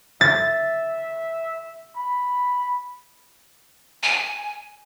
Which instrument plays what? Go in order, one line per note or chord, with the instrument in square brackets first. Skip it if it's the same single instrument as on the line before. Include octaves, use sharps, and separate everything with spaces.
[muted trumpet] E5 [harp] A6
[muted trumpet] B5
[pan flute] G#5